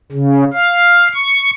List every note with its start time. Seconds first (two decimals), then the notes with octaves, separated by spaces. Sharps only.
0.12 C#3
0.53 F5
1.14 C#6